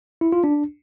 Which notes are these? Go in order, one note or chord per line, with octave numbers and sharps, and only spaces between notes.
E4
F4
D4